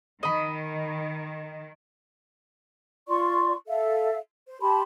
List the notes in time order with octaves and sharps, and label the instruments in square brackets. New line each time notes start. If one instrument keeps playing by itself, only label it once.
[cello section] D#3 [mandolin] D#5 B5
[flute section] F4 D5 C6 C#6
A4 E5 F5
C5
G4 A5 B5 C6